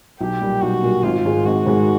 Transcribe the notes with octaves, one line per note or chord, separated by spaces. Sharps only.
B1 G4
A#2 G3
B1 F#4
A#2 G3
G#1 F4
G#2 D#3 G#3
G#1 F#4
G#2 D#3 G#3